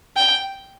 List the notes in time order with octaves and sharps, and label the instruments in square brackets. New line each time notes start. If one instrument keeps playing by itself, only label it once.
[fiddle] G5